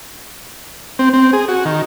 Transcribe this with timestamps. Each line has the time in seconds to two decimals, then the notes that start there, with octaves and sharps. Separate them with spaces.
0.99 C4
1.14 C4
1.33 G#4
1.48 F#4
1.65 D#3